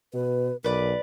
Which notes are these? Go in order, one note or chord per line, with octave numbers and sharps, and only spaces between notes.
B2 B4
B1 A#4 B4 D5